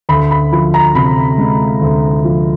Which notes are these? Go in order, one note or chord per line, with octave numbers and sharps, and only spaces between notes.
D2 B5
B5
F3 B5
A#5
C3 B5
G#3
D2
F3